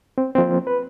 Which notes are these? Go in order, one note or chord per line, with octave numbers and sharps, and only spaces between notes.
C4
F3 A#3 C4
B4